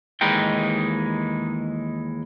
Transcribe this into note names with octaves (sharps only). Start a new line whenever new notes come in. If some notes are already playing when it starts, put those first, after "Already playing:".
D#2 E3 G#3 D#4 G5